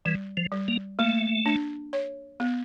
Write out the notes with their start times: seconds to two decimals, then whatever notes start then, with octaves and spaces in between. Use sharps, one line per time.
0.05 E3 G3
0.37 F3
0.52 G3
0.68 A#3
0.99 A3 A#3
1.46 D4
1.93 C#5
2.40 B3